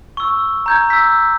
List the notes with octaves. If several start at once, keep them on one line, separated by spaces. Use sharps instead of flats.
C#6 E6
A#5 G6 G#6
E6 B6